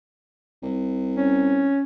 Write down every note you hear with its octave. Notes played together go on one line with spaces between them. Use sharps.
C2
C#4